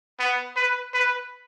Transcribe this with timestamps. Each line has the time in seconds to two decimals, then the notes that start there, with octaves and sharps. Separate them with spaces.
0.19 B3
0.56 B4
0.94 B4